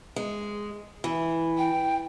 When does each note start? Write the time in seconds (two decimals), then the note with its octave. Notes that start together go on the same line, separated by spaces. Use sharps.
0.16 G#3
1.04 E3
1.58 G5